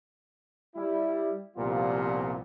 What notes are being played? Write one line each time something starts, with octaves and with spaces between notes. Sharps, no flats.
G3 E4
C2 A#2 F3 G3 B3 F4